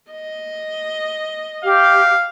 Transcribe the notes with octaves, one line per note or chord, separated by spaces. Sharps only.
D#5
G4 F5